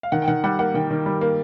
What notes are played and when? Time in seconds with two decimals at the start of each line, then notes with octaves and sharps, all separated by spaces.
0.03 F5
0.12 D#3 F#5
0.22 G5
0.28 D#3 F#5
0.44 G3 F#5
0.59 A#3 F#5
0.74 D#3 G5
0.91 D#3
1.06 G3
1.21 A#3